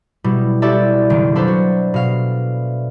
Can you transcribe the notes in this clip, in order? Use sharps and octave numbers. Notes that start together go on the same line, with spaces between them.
B2 G3 E4
E4 F#4 G4 A4 D5 E5
F#1 D#3 B3 D7
D4 A4 B4 C5 F5
F#4
B2 F5